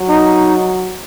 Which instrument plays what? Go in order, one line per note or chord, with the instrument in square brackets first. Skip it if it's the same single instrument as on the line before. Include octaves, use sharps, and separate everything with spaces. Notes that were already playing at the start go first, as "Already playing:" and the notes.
Already playing: [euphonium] F#3
[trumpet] D#4